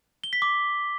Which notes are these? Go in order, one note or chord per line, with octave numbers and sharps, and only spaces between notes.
G7
B6
D6